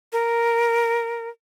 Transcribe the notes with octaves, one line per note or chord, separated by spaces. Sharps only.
A#4